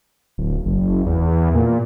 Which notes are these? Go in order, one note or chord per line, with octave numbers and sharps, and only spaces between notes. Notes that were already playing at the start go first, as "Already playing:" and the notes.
D1
F#1
E2
A#2